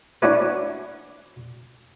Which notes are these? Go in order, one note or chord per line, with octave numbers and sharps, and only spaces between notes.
C#4 D4 E4 F#4 B4